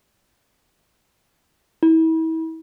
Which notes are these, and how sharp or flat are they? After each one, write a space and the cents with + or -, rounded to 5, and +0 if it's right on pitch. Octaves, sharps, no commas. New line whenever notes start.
E4 -35